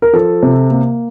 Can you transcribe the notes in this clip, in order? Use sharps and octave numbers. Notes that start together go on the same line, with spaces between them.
A#4
F3 A4
C3
A#3